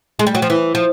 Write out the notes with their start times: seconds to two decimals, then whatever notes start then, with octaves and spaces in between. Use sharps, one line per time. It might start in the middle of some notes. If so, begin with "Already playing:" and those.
0.19 G#3
0.27 G3
0.35 F#3
0.42 F3
0.50 E3
0.75 F3